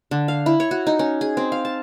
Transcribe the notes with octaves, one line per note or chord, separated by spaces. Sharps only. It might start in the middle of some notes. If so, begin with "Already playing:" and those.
D3
F5
E4
C#5
F#4
D#4
C#4
G#4
C4
F5
A5